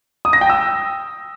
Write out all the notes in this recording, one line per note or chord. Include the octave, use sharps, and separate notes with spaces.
D#6
A#6
G5
E6